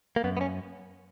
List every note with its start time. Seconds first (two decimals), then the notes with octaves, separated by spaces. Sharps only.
0.16 A#3
0.24 F#2 B3
0.37 B3
0.41 C#4